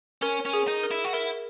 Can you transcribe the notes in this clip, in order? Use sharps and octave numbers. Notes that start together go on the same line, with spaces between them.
C#4 A#4
C#4
G#4
D#4
A#4
E4
F#4
E4 A#4